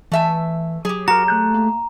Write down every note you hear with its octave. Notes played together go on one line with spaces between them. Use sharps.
E3 A3 E5 G#5
F#3 G4 G#4
F#4 A#4 A#5
A3 F#6 G6
A#3